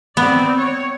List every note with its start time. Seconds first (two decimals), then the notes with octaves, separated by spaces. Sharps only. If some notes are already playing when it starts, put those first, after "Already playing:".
0.17 B3 C4 D5
0.56 C#5